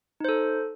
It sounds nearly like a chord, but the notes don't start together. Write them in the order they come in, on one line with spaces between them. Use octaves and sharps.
D#4 C5 A4